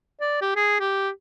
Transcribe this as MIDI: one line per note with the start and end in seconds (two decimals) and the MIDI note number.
0.20 0.37 74
0.41 0.52 67
0.56 0.79 68
0.80 1.09 67